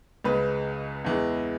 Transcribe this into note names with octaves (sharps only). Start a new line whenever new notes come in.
C#2 C#3 G#3 B4
E2 E3 G#3